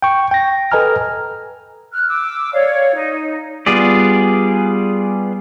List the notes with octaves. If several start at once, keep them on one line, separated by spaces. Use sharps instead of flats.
G5 C#6
G5 A#6
A4 B4 D#5 G#5 A#5 F6
F6 F#6
D6 E6
C#5 D5 F5
D#4
G3 B3 F4 G#4 D5